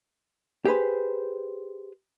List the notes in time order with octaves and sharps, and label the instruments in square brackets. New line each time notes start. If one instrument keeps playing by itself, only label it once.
[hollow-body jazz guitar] G4 G#4 B4 C5